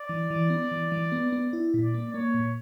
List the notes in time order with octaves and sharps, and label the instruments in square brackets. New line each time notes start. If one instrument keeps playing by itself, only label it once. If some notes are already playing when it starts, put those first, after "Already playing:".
Already playing: [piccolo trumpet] D5
[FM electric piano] E3
E3
B3
E3
E3
B3
B3
E4
A#2
[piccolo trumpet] D5
[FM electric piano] A#3
[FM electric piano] A#3 [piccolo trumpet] C#5
[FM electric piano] A#2